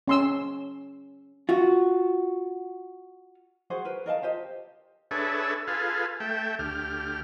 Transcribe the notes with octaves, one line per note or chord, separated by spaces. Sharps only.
C#4 C6 E6
F4 F#4
F#4 G#4 C5 F#5
A#4 B4
A#4 D#5 F5 A5
F4 G4 C5 D#5
D4 G#4 A4 B4 C#5 E5
F4 G#4 A4 B4 F5
A3 E5 G5
D2 G4 F6